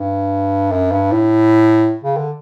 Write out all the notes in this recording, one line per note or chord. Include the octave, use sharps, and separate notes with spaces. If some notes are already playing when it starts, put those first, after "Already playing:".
Already playing: G2
F#2
G2
A2
C#3
D3